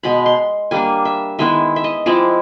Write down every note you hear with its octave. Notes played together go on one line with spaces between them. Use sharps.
B2 G#3 B3 B5
C6
G3 A#3 D4 G#5
E5
D#3 G#3 B3 E4 E5
E5
D#5
F3 G#3 C4 E4 D5